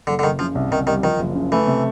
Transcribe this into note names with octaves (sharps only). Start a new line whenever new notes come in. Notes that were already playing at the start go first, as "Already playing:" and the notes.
F#1 D3
D3
F#1 D#3
C#3 F3
C2
C2 D#3
D#3 G3
D#3 F3
F#1
C#3
E3 A3
C3